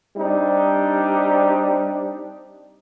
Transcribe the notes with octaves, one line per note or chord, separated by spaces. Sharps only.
G3 C4 D4 D#4